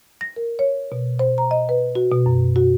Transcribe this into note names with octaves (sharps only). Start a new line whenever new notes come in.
A#6
A#4
C#5
B2
C5
A#5
D#5
B4
F#4
B2
F#2
F#4